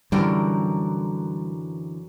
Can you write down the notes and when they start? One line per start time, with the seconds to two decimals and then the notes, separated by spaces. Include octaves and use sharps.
0.12 F#2 D3 E3 G3 A#4 G5